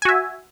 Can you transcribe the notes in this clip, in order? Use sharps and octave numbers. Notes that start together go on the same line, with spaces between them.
F#4 E5 G#5